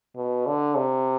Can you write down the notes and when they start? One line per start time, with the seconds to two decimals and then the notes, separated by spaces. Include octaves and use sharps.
0.16 B2
0.47 D3
0.76 C3